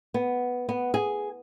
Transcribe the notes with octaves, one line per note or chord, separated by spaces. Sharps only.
B3
B3
G#4